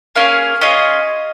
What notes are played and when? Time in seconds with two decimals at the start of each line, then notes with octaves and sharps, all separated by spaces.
0.16 A#3 C#4 G#4 F5
0.61 C#4 F4 G#4 D#5